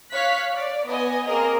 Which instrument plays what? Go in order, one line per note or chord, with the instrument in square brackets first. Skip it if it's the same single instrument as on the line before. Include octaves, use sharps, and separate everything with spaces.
[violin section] C#5 F5 F#6 B6
D5
B3 D#5 G#5
A#3 C4 G#4 A#4 D#5